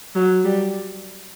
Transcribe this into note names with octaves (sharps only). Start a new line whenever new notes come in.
F#3
G3